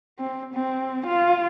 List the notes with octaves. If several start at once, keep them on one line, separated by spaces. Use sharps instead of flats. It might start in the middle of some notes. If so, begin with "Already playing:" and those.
C4
C4
F4